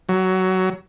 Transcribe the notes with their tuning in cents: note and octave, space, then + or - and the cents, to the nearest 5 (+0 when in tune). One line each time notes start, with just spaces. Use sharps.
F#3 +15